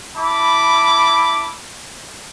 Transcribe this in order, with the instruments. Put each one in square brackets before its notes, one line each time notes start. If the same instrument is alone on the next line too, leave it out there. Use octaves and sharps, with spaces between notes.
[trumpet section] E4 A5 B5 D6